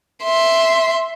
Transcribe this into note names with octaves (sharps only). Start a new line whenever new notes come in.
E5 C6